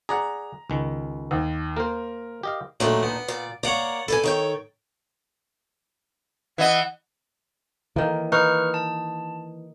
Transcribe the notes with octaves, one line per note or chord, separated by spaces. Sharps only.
G#4 D5 F#5 A#5
C#2 D#3
D#2
A#3 A#4 C5
G4 D#5 F5
A#2 F#3 A3 D4 D#4
B3
A#2 D5
A#3 C#5 D5 F#5 A#5
A4 B4 D5 G#5
D#3 C#5 G5
E3 D#5 F#5
D#3 E3 A#3
D#4 B4 C#6 F6
A5